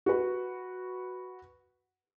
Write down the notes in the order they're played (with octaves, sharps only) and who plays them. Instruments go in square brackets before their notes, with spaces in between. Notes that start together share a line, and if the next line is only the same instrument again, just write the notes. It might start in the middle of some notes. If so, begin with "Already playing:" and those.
[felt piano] F#4 B4